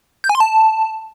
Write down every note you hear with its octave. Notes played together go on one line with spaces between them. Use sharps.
G6
G#5
C6
A5